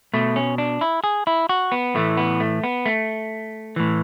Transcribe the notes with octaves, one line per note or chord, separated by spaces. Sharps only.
B2 A3
C#4
D4
E4
G#4
E4
F#4
B3
A2 E3 A3
B3
A3
B3
A3
A2 E3